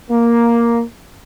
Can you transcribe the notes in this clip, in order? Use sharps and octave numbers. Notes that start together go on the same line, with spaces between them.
A#3